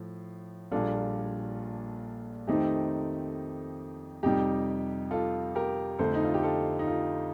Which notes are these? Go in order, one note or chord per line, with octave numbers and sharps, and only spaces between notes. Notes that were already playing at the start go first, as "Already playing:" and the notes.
Already playing: A2 F3
A#1 A#2 G3 D4 F4 A4
F2 D#3 A3 C4 D#4 G4
F2 C3 G3 D#4 G4
F4 A4
G4 A#4
F2 D3 A3 C4 A4 C5
D#4
F4
G4
F4 A4
D#4
F4